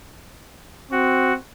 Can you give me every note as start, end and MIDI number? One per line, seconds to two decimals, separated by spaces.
0.91 1.37 60
0.91 1.33 66